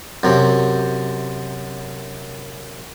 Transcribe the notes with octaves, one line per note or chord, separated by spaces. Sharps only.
F#2 C3